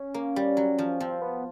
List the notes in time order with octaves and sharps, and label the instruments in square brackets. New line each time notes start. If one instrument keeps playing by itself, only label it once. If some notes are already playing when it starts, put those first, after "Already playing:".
Already playing: [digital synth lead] C#4
[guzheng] A#3
G3
F#3
F3
[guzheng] F3 [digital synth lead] C4
[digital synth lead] B3